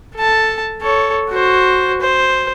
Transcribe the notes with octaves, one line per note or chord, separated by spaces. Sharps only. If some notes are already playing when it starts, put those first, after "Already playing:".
A4 A5
A4 C#5
F#4 C5
C5